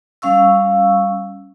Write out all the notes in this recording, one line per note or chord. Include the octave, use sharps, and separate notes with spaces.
G3 C#4 F5 C#6 E6